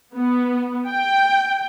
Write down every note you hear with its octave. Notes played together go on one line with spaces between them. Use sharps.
B3
G5